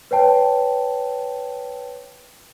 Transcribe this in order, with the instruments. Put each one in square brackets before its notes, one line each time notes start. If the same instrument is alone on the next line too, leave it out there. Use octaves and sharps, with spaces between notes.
[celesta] B4 C#5 G5 A5